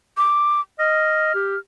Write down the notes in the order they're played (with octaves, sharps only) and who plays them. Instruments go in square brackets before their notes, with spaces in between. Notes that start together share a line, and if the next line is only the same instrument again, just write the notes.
[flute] D6
[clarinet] D#5 [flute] F6
[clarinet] G4